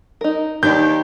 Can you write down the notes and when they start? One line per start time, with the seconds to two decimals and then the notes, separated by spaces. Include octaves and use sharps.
0.21 D#4 A#4
0.63 D#2 D#3 E3 D4 G4 G6